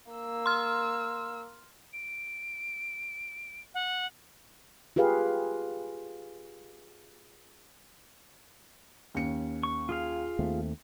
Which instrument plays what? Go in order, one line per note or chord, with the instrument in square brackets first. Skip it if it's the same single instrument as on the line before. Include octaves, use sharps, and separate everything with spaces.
[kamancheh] A#3 E6
[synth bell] C6 F6
[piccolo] D7
F#5
[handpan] F4 G4 G#4 B4 F5
[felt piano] D#2 C#4 C#7
[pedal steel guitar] C#6
F4 G#4 F5
[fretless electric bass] D#2 A3 C4